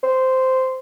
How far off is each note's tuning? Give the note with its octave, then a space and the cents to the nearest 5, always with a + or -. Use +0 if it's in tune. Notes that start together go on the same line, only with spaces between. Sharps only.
C5 -10